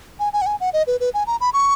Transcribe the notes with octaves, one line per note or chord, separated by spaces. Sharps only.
G#5
G#5
F#5
G#5
F#5
D#5
B4
B4
G#5
A#5
B5
C#6